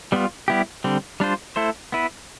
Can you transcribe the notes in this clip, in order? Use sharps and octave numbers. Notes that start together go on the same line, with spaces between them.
G3 B3 F4
G3 B3 E4 G4
D3 G3 C4
G3 D4 F4 C5
A3 E4 A4 C5
B3 E4 B4